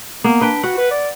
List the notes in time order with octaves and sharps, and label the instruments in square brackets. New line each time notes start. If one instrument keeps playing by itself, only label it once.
[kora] A#3 [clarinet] B3
[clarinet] D4 [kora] B4 G5
[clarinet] F#4 [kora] F#5
[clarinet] B4
D5